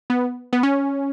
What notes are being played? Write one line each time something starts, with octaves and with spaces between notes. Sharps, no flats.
B3
B3
C#4